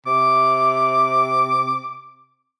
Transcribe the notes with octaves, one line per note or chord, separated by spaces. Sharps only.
C3 D6